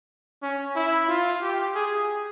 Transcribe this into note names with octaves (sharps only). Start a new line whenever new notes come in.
C#4
E4
F4
G4
G#4